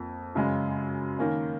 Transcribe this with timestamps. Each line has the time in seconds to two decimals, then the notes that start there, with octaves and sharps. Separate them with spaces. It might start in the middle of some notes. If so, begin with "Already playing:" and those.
Already playing: F2 A#3
0.35 F#2 C#3 G#3
1.19 D#3 A#3 C#4